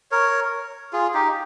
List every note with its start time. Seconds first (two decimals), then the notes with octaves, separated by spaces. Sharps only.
0.11 A#4 C#5
0.93 F4 G#4
1.14 D#4 G4